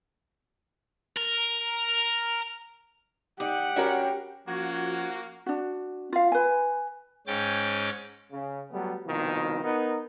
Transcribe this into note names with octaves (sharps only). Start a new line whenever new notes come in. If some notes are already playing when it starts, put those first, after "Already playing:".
A#4
D#4 G4 D5 F#5
G3 C#4 D4 F#4 A#4
F3 A#3 C#4 F#4 G#6
D4 F#4
F4 F5
B4 G#5
G#2 C#4 G5 A6
C#3
F#3 G3 A3 B3
C2 B2 D#3 F3
B3 D#4 A#4